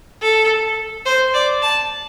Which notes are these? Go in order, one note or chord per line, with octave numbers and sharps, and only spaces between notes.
A4
C5
D5
A5